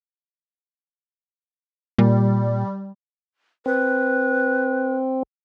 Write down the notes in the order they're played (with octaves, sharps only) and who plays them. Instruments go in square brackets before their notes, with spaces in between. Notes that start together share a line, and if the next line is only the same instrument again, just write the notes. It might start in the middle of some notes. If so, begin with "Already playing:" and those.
[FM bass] A#2 [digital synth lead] G3
[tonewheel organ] C4 [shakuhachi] B4